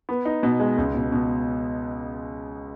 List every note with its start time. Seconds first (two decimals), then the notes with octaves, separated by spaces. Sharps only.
0.09 B3
0.25 D#4
0.43 B2
0.60 G#3
0.78 C#2
0.95 B2
1.12 B2